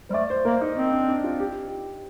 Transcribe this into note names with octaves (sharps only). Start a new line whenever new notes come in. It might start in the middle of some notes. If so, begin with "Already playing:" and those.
G3 C5
A3 D5
C5
A#3 A#4
D#4
C4
D4
D4
F4
G4